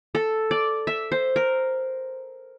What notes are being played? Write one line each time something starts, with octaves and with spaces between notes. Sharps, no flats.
A4
D5
E5
C5
A#4